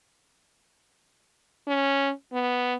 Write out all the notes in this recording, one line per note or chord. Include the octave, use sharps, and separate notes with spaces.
C#4
B3